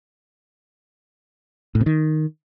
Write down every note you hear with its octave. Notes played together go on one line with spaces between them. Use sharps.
A2
C3
D#3